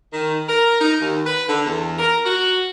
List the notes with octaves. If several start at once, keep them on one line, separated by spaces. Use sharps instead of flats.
D#3
A#4
D#4
D#2
B4
D3
E2
A#4
F#4